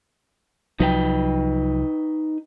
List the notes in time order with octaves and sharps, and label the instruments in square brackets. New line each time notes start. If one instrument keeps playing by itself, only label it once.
[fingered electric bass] C2 F3 F#3 [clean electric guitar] D#4 B4 G5